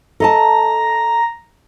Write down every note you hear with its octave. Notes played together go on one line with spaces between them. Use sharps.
A4 D#5 A5 A#5